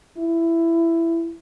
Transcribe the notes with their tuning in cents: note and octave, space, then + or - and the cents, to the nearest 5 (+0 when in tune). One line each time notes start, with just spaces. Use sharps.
E4 +15